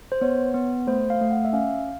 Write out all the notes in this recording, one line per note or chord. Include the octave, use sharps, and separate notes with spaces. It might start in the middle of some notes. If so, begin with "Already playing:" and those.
C5
B3 C#5
B3
A3 C5
F5
A3
F#5
E5
C#4 F5